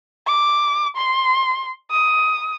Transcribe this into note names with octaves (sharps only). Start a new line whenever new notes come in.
D6
C6
D#6